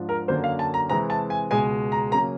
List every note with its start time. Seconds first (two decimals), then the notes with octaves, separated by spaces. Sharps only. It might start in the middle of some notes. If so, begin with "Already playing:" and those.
Already playing: G#2 F3 D4
0.09 A#4
0.28 F#2 D3 F#3 A#3 C5
0.44 F5
0.59 A5
0.74 A#5
0.89 C3 E3 G#3 C4 A#5
1.10 A5
1.30 G#5
1.51 C#2 B2 G#3 G#5
1.92 A#5
2.12 C#3 F#3 A#3 A#5